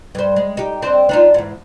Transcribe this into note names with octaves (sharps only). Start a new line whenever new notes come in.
G2 C5
G#3
D#4 G4
C4 D4 C5
D4 D#4 F4
E2 G#2